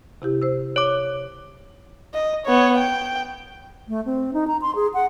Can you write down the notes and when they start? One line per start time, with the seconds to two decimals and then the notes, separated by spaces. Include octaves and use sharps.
0.22 C3 E4 G4
0.42 C5 E6
0.76 C#5 D6
2.14 D#5
2.46 B3 C#5
2.78 G5
3.88 A3
4.05 C4
4.33 D#4
4.47 A#5
4.62 C6
4.75 G#4
4.94 F#5